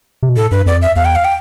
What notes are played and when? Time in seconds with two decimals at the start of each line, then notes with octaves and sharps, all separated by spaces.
0.23 C3
0.29 B2
0.36 A2 A4
0.51 G2 B4
0.66 F2 D5
0.82 E5
0.96 E2 F5
1.05 G5
1.15 F5
1.25 G5